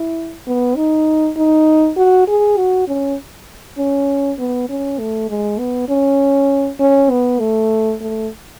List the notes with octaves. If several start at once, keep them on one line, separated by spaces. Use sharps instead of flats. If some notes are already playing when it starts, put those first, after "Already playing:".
Already playing: E4
B3
D#4
D#4
F#4
G#4
F#4
C#4
C#4
B3
C#4
A3
G#3
B3
C#4
C#4
B3
A3
A3